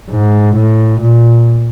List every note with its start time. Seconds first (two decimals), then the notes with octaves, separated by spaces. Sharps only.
0.10 G#2
0.56 A2
1.00 A#2